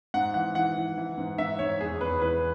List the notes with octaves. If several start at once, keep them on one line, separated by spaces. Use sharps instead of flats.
G#2 F#5
E3 F#5
E3 F#5
E3
E3
G#2
G#2 E5
G#2 C#5
E2 G#4
E2 B4
E2 B4